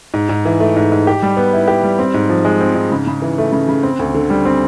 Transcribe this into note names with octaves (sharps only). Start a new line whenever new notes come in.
G#2
G#2
E3
A3
G#2
G#2
G4
G3
B3
E4
G4
G3
C4
G#2
F3
G#3
C4
G#2
C#3
C#3
E3
A3
C#3
C#3
C4
D2
D3
G3
C4